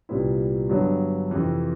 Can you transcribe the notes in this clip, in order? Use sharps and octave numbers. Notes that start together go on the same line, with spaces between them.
C2 A#2 G3 B3 E4
G2 D3 F#3 B3
F2 C3 E3